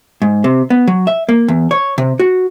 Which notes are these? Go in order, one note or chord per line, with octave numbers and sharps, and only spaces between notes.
G#2
C3
B3
F#3
E5
A#3
E2
C#5
C3
F#4